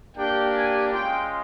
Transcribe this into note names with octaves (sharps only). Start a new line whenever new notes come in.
A#3 D4 G4 G5
G#5
G#3 C#4 F4 G5